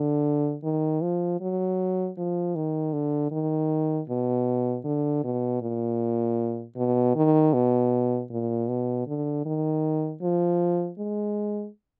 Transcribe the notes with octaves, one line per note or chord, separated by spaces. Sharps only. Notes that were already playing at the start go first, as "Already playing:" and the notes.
Already playing: D3
D#3
F3
F#3
F3
D#3
D3
D#3
B2
D3
B2
A#2
B2
D#3
B2
A#2
B2
D3
D#3
F3
G#3